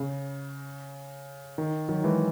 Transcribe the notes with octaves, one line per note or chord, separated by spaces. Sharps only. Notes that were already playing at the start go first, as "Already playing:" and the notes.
Already playing: C#3
D#3
D#3 F#3
E3 G#3